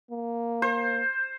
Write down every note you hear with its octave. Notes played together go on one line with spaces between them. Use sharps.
A#3
C5